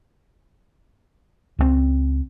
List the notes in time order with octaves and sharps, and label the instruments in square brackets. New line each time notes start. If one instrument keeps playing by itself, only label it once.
[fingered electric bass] C#2 F3 C4